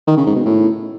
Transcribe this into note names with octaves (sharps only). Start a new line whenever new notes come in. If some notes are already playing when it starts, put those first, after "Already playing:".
D#3
C#3
G#2
B2
A2